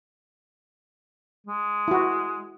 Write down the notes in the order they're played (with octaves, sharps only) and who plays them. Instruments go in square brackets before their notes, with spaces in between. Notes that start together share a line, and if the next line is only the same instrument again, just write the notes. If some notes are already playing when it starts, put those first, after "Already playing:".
[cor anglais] G#3
[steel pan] E4 F#4